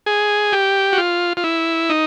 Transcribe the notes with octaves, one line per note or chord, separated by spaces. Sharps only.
G#4
G4
F#4
F4
F4
E4
D#4